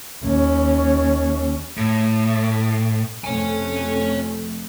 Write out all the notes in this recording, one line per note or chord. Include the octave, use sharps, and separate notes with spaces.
D#2 C#4
A2
F2 C3 A3 C#5 G#5